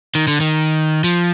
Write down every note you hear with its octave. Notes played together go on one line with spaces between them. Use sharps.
D#3
D3
D#3
F3